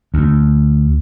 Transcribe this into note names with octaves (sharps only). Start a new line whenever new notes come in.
D2